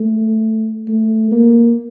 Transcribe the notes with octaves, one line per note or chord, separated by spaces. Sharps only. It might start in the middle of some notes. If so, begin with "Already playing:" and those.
Already playing: A3
A3
A#3